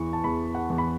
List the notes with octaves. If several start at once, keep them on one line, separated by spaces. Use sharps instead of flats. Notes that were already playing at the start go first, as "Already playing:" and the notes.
Already playing: E2 E3 C#6
A5
E2 B5
F#5
E2
B5